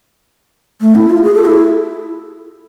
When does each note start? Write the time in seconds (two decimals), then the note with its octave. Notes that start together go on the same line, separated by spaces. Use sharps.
0.81 A3
0.95 E4
1.10 F4
1.23 G#4
1.34 A4
1.45 E4